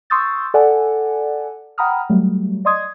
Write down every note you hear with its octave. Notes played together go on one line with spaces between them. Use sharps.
C6 C#6 D#6 E6 G6 A6
A4 D5 F#5 G#5
F#5 G5 A#5 B5 D#6 F6
F#3 G3 A3
D5 D#5 C6 D#6 G#6